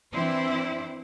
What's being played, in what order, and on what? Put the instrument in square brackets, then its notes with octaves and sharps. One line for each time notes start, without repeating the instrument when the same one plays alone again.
[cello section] E3 C4 D4 E4 C5